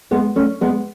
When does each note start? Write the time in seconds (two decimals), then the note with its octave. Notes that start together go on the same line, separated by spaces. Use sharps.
0.11 G#3 B3
0.36 A3 C#4
0.61 G#3 B3